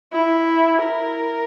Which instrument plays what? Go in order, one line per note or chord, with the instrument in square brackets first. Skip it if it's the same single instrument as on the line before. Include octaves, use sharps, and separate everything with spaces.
[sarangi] E4
A#4